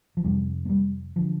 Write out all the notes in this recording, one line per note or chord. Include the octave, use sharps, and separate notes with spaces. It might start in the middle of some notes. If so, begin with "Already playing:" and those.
F3
F2 C3 G3
A3
G3
D3 F3